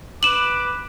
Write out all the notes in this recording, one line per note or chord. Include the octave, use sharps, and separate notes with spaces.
B4 D6 E7 F#7